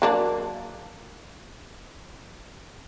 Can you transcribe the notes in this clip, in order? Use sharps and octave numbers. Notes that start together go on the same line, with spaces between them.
F#3 A#3 D4